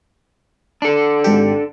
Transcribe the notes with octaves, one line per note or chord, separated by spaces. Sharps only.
D4 A4
G#1 G4